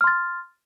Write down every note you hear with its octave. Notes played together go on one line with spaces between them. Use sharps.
C6 F6 A6